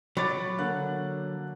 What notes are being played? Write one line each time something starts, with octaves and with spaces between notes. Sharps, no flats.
F#3 B5 D6 A6
D3 A#3 F#6